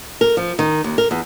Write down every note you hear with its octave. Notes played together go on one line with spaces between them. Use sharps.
A#4
F3
D#3
D#2
A#4
E2